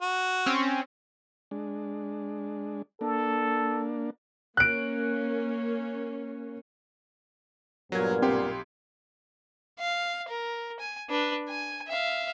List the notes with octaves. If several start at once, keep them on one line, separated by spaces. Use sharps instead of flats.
F#4
C4 C#4
G#3 D4
A#3 D4 A4
A#3 C#4 F#6 D7
G2 A#2 F#3 B3 A#4 G#6
B1 C4 G4 C6
F5
A#4
G#5
D4 B4
G#5
E5 F5